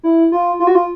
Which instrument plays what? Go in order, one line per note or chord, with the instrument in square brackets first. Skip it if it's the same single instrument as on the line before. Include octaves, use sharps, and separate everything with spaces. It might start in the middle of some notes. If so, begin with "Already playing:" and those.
[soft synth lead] E4
F4
F4
F#4
F4